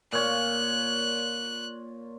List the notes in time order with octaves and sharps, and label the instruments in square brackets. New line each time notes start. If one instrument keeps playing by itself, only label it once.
[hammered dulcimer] A#2 C#5 [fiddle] F#6